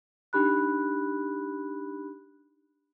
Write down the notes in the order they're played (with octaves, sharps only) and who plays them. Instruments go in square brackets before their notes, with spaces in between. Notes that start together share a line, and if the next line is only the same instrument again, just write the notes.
[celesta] D4 D#4 G4 B5 F#6